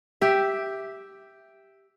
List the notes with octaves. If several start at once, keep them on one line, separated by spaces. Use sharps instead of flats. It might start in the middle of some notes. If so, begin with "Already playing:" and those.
G4 E5